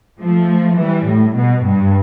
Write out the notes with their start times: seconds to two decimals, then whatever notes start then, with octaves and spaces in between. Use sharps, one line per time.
0.20 F3 A3
0.78 E3 G3
1.07 A2
1.36 B2
1.66 G2